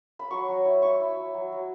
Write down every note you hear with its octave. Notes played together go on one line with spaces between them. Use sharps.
B5
F#3 C#6
F#3
E4
E4 C#6
E4
F#3
F#3
F#3